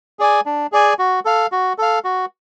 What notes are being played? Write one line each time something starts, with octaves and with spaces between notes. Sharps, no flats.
G#4 D5 G#5
D4
G#4 D5 G#5
F#4
A4 F5
F#4
A4 F5
F#4